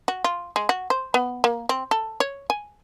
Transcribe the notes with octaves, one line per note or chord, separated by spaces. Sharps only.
F#4
F4
G#3
F#4
C5
B3
A#3
C4
A4
C#5
G#5